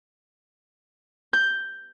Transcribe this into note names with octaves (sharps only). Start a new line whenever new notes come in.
G6